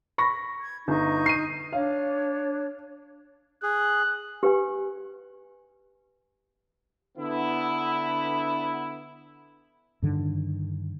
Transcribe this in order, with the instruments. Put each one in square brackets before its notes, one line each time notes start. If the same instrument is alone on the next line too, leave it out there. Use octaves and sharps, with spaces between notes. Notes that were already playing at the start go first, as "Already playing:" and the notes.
[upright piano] B5 C#6 A#6
[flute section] G#6
[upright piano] G1 [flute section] D#4 C#6 G6
[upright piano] C7 D#7
[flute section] D4 C#5 [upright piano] F5
[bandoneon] G#4 [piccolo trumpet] F#6
[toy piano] G4 B4 G#5
[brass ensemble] D3 B3 E4
[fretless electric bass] G2 D3 D#3